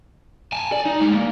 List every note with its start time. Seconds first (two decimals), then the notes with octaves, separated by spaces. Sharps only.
0.52 G#5 A5
0.72 D5
0.86 D#4
1.01 G3 G#3
1.15 A#3